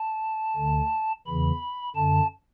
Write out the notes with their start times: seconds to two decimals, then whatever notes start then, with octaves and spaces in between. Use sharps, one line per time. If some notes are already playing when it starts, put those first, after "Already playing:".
Already playing: A5
0.56 D2 D3
1.27 E2 C#3 E3 B5
1.96 F#2 D3 A5